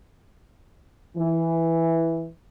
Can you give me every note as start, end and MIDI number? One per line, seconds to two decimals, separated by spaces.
1.16 2.28 52